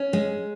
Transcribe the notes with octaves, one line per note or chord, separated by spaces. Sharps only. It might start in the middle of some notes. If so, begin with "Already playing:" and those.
Already playing: C#4
G#3